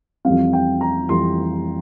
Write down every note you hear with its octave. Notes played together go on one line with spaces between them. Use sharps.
F2 E3 G3 C4 F5
G5
A#5
F2 E3 G3 C4 C6